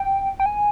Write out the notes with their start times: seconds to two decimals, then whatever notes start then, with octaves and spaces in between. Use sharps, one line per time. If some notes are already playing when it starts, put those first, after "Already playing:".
Already playing: G5
0.40 G5
0.46 G#5